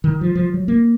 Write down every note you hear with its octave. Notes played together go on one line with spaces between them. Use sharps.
D#3
F3
F3
F#3
A#3